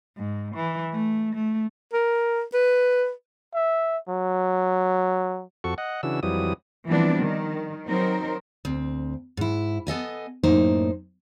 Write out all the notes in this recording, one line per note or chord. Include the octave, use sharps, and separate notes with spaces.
G#2
E3
A3
A3
A#4
B4
E5
F#3
F2 F#4 A4 C#6
D#5 F#5
C#3 E3 D4 F#4 E6
F2 E3 F#3 G3 D#6
E3 F3 G3 B3 C4 D4
D#3
F#3 C4 D#4 A#4 C5
D2 C4
G#2 E4
B3 A4 D#5 G#5
F#2 A2 A#3 D#4 C5